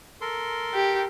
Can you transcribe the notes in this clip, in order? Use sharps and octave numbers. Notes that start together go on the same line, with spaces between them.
A4 A#4 C6
G4